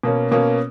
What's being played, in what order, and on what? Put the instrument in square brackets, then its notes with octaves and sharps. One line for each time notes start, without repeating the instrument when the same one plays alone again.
[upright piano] B2 A#3 C#4
B2 A#3 C#4